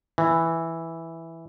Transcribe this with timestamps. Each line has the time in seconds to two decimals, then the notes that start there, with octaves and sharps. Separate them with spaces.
0.18 E3